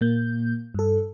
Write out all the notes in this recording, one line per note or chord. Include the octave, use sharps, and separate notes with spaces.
A#2 A#3 G6
G2 A4